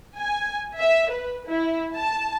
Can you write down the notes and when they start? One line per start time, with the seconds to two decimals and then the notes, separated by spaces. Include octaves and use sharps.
0.17 G#5
0.78 E5
1.11 B4
1.48 E4
1.96 A5